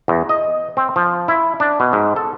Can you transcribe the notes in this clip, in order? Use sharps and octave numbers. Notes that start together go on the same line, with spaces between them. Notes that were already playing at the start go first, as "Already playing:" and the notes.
E2
D#5
C4
F3
E4
D4
B2
G#2
A4